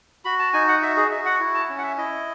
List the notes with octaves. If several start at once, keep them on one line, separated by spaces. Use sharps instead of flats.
F#4 B5
A5
D#4 G#5
F#5
F#4 E5
G#4
F#4 E5
F#5
E4
A5
C#4
F#5
E5
E4 D#5